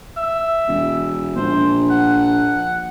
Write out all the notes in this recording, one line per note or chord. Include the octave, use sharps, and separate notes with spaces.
E5
E1
A#1 C5
F#5